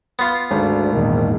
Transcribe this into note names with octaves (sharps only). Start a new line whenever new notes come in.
B3 F4
G#1 D2
A#1 E2 G#2 D#3